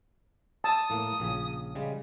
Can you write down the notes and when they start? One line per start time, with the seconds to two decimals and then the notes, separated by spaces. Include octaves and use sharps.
0.64 A5 D#6
0.90 A2 A#3
1.20 A#1 C#3
1.75 C#3 G3 G#3